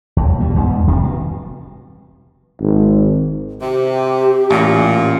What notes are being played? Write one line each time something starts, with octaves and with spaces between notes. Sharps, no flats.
D#2
B2 G3
E2 G#2 A3 B3
F1 C3 D#3 G3
B2
G#1
C3 G4
A1 A#2